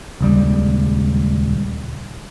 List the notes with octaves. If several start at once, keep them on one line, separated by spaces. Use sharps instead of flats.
D#1 C#2 G3